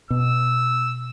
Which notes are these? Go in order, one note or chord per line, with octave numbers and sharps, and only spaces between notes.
B2 E6